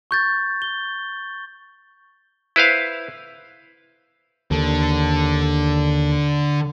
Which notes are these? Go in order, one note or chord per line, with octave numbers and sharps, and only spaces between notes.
C#6 G6 A6
G7
E4 B4 C5 F5
D#2 D3